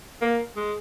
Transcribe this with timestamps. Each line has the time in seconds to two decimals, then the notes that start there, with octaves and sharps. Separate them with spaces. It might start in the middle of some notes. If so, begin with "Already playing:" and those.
0.22 A#3
0.56 G#3